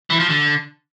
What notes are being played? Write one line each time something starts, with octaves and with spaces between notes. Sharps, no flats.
E3
F3
D3